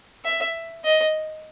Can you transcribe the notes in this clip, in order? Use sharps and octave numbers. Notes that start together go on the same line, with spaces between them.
E5
D#5